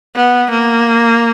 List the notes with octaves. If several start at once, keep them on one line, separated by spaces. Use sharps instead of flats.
B3
A#3